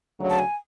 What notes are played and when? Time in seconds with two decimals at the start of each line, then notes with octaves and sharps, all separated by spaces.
0.18 D2 C#3 F#3
0.30 A5
0.39 G#5